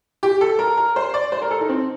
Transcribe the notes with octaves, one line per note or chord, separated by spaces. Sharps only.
G4
A4
A#4
A#4
C5
D5
C5
A#4
A4
D#4
C4